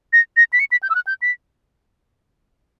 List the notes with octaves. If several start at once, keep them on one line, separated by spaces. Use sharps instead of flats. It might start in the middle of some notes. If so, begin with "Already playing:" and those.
A#6
A#6
B6
C#7
B6
G6
E6
F#6
G6
B6